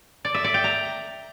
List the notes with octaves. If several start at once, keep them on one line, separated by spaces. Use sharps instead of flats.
D5
E5
D5
G5
A#5